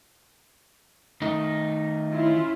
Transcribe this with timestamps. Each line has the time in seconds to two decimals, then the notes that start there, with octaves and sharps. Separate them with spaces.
1.22 D#3 A3 D#4
2.11 C#4 E4 F4